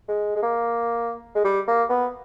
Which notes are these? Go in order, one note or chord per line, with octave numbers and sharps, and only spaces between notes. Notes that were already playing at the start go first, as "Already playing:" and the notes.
G#3
G#3
A#3
G#3
G3
A#3
B3